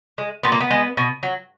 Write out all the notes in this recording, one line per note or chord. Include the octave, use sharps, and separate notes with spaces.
G#3
A#2 B3
A#3
B3
G#3
B2
F#3